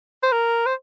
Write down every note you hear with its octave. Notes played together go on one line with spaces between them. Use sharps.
C5
A#4
C5